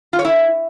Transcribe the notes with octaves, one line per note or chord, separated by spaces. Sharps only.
F4
C#5
E4